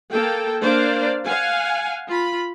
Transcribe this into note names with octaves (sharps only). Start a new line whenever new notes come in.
A#3 A4 G5
A#3 D4 C5 D5 F5
F5 F#5 G#5
F4 B5